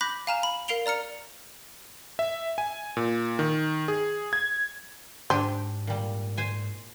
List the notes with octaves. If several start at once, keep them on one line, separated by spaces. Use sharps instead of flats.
B5 D6 F#6 G6 A#6 B6
F5 G#5 A#5 F6 E7
B5
A#4 F5 C7 D7 F7 G7
D5 A#5 F6 C#7 F7
E5
G#5
A#2
D#3
G#4
G#6
G#2 D4 G4 C5 G#5
A#2 G3
C5 G#5